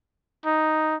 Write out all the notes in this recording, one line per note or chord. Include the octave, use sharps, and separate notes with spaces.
D#4